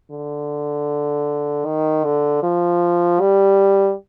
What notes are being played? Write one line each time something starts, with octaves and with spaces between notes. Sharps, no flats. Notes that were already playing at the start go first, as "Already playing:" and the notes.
D3
D#3
D3
F3
G3